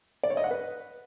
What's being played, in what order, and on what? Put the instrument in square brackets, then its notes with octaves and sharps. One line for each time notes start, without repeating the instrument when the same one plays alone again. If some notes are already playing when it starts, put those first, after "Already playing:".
[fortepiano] D5
C#5
D#5
F#5
B4